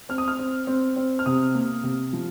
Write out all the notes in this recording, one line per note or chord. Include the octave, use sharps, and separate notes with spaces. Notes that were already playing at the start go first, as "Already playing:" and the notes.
C4 F6
D#6
F6
C4
C4
C4
F6
C3 D#6
A#3
C3
F3